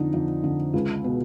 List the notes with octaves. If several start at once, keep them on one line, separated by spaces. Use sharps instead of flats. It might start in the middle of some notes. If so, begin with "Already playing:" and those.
Already playing: F2 D3 D#4
F2
D3
C#2
B2